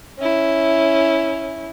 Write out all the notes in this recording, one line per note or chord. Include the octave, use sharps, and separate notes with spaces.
C#4 E4